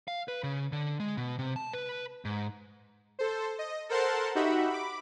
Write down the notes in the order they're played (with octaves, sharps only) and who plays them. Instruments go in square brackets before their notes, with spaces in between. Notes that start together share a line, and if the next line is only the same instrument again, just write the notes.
[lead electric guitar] F5
B4
C#3
D3
G#3
B2
C3
A5
B4
G#2
[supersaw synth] A4 C5
D#5
A4 A#4 C5 F#5 A5 C6
D#4 F#4 G4 E5 F#5 B5
B5 D6